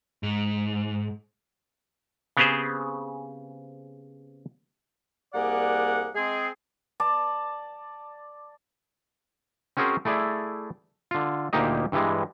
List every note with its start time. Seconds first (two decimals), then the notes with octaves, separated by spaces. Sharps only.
0.23 G#2
2.37 C#3 B3 C4 G4 G#4 C5
5.33 C2 G3 A#3 G#4 D5 F#5
6.15 G#3 C4 G#4
7.00 D5 A5
9.77 C4 C#4 F#4 G#4 A#4 C5
10.05 A3 E4 G#4 D5
11.11 D3 F4
11.53 D2 A#2 A#3 D#4 G4 D#5
11.92 G2 E3 G3 G#3